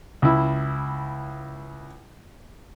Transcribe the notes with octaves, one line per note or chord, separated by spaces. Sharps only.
C#2 E4